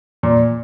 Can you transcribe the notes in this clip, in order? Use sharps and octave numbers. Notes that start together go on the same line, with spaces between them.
A#2